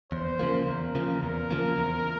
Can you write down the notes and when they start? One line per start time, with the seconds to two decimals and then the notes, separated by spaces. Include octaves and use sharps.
0.12 E2 C5
0.39 C#3 F3 A#3
0.67 E2 A#4
0.95 C#3 F3 A#3
1.22 E2 A#4
1.51 C#3 F3 A#3
1.78 E2